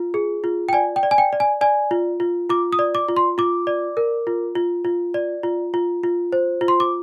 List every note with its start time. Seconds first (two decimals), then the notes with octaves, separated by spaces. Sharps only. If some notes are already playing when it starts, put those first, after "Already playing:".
Already playing: F4
0.14 G#4
0.44 F4
0.69 G5
0.73 D5 G#5
0.96 G5
1.03 D5
1.11 G#5
1.18 G5
1.33 D5
1.40 G#5
1.61 D5 G#5
1.91 F4
2.20 F4
2.49 F4 D6
2.73 D#6
2.79 D5
2.95 D6
3.09 F4
3.17 C6
3.38 F4 D6
3.67 D5
3.97 A#4
4.27 F4
4.55 F4
4.85 F4
5.14 D5
5.43 F4
5.74 F4
6.03 F4
6.33 C5
6.61 F4
6.68 C6
6.80 D6